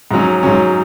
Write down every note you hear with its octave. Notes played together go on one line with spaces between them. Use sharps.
G#2 F#3 C#4
G#2 F#3 C#4